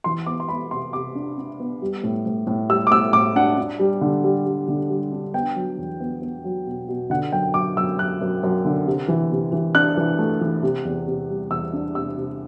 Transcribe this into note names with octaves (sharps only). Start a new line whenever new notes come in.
E3 C6
B3 D6
C6
B3 B5
C3 C6
C3 D6
D4
D4
B3
G3
A2
A2
A2
G3 E6
D6
A2 E6
A2 D6
D4 F#5
D4
G3
D3
G3
G3
D3
G3
D4
B3 G5
F#3
E2
B3
B3
F#3
B2
B2
D3 F#5
F#2 G5
F#2 D6
F#2 E6
F#2 F#6
F#2
F#2
D3
C3
E3
C3
E3
D4 F#6
E3
A3
E3
C3
E2
C3
G3
E2 E6
D4
C3 E6
C3